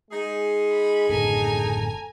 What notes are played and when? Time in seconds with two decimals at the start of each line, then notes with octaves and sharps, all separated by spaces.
0.10 G#3 D#4 G#4
0.69 B5
1.09 F#1 A2 D3 A4 G#5 A#5